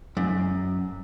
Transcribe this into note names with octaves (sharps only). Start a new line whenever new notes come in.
F#2